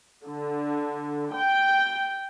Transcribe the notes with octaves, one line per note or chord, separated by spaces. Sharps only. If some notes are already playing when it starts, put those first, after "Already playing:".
D3
G5